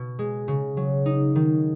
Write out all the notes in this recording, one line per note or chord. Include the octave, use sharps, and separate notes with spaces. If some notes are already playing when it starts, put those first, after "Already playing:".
Already playing: B2
G#3
C#3
F#3
D#4
D#3